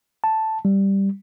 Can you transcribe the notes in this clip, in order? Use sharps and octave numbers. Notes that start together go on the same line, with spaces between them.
A5
G3